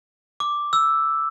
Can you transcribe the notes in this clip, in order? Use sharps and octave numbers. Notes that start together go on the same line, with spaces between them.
D6
E6